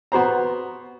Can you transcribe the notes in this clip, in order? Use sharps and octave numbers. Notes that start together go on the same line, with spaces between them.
B3 F#4 C5 A#5